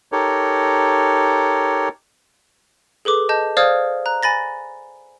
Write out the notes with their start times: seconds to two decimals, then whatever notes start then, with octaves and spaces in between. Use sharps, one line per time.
0.12 D#4 G4 A4 A#4 C#5
3.05 G#4 A4 B4 D6
3.29 D#5 A5 G6
3.57 C5 D5 F5 D#6 F6 G#6
4.06 A#5 F#6
4.23 G#5 B5 A6 A#6